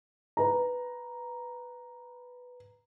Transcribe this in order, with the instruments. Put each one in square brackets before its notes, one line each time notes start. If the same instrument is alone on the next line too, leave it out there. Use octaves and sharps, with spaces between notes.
[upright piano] B4 A#5